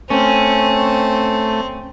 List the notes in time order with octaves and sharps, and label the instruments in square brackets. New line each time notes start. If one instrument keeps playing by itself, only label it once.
[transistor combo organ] A3 [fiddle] C4 [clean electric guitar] C#4